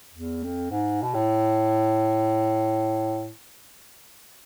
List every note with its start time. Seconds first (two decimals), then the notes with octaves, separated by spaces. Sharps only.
0.14 E2
0.43 F2
0.71 G#2
1.03 B2
1.14 A2